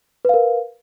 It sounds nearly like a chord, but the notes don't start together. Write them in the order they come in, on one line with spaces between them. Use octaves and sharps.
B4 F5 A#4